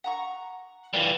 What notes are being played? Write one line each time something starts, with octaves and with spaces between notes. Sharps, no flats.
F#5 A#5 C#6
E3 G3 F4 B4